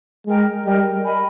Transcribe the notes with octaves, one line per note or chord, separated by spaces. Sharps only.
G#3 A#4 D#5 G5
G3 A#4 D#5 G5
A#4 D#5 G#5 B5